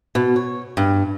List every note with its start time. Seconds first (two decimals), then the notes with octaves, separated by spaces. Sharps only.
0.15 B2
0.36 C#5
0.77 G2